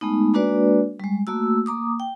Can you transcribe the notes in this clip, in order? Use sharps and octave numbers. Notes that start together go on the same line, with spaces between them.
G#3 A3 B3 D#4
G#3 A#3 D4 F#4 B4 D5
G3 G#3
A3 A#3 F#4 E6
A#3 A#5 D6 D#6
G5